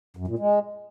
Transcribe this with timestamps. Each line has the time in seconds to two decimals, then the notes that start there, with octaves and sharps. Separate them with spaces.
0.17 F#2
0.28 A#2
0.39 G#3